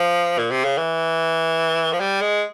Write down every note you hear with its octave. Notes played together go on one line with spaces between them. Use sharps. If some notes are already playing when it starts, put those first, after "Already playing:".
Already playing: F3
A#2
C3
C#3
E3
F3
G3
G#3